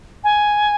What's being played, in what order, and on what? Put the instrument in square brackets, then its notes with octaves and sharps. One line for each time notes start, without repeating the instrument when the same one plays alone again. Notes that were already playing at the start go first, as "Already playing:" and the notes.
[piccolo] G#5